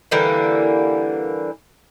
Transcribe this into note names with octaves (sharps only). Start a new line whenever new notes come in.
D3 E3 G3 A#3